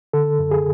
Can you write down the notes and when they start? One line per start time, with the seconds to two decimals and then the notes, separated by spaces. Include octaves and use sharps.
0.13 D3 A4
0.39 F#2
0.51 G#4